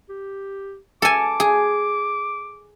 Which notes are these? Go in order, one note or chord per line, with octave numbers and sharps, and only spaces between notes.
G4
A4 G#5 D6
G#4